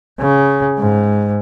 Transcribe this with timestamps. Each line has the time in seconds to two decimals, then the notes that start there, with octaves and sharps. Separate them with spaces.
0.19 C#3
0.79 G#2